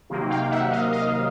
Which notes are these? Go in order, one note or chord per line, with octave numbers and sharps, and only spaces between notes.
C3 D#3 F#3 A#3
F5 G5
E5 F#5
D#5 F5
D#5 F5